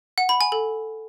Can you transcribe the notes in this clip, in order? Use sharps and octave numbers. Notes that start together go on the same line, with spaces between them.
F#5
B5
G#5
A4